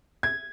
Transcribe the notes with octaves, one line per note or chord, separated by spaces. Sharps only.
G#6